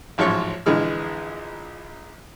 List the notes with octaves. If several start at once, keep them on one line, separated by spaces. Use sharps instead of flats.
A1 G#2 F3 F#3 C#5 C#6
A#1 D3 E3 G#3 F6